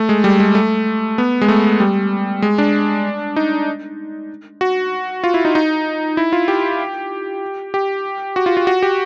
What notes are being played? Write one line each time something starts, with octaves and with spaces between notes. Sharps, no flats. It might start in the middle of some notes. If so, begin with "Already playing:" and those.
Already playing: A3
G#3
G3
G#3
A3
B3
G#3
A3
G3
G#3
D4
D#4
F#4
F4
E4
D#4
D#4
E4
F4
G4
G4
F#4
F4
F4
F#4
G4